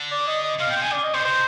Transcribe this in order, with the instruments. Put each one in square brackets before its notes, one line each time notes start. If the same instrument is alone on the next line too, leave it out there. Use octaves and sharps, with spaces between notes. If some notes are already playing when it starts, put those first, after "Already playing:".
Already playing: [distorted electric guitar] D3
[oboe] D5
D#5
D#5
[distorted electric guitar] C3 [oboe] F5
[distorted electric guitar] B2 [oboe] G5
[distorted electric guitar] C3
[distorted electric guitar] D3 [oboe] G#5
[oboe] D5
D#5
[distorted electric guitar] C3 [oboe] C5
[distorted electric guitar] C3 [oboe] C5